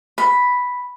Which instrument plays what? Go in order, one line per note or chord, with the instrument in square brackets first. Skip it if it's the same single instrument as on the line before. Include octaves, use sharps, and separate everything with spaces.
[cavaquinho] B5